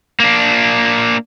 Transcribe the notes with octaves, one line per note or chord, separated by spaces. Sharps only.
A#3 D4